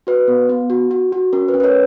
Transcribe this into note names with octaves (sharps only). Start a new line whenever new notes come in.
F#4 B4
B3
B3
F#4
F#4
F#4
C#4 A#4
B4
C#4
B4
A#4 C#5